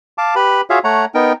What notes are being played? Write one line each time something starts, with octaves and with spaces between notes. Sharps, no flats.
F5 A5 D6
G4 B4 B5
F4 F#4 G#4 C#5 E5 F5
A3 C#5 F#5 A#5
B3 D#4 A#4 G5